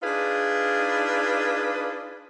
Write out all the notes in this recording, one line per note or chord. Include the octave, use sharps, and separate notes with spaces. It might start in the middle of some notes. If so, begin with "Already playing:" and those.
D4 D#4 F4 G#4 B4